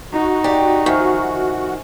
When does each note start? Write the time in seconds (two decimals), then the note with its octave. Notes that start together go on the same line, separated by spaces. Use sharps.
0.13 D#4 F#4
0.44 G4 D5
0.86 D#3 F3 E5 G#5 C#6